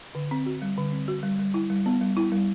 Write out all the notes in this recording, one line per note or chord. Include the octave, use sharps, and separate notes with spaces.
D3
C4
F#4
G3
D3
C4
F#4
G3
G3
E4
G3
B3
G3
E4
G3